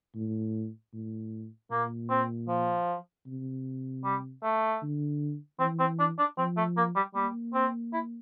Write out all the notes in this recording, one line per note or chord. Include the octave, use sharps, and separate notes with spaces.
A2
A2
A#2 A#3
C4
F3
C3
G3
A3
D3
E3 C4
C4
D4
D4
F3 C4
A3
A#3
G3
G3 A#3
C4
E4